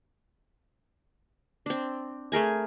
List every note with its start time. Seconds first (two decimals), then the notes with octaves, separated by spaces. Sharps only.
1.66 C4 D4
2.32 A3 G#4 A#4 G#5